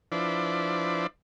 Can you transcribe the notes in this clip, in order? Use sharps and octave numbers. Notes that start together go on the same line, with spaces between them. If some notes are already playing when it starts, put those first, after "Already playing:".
F3 D4 E4 B4 C5 D5